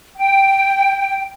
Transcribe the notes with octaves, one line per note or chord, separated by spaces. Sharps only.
G5